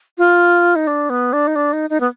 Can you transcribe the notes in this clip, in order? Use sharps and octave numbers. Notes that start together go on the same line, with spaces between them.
F4
D#4
D4
B3
D4
D#4
D4
D#4
D#4
B3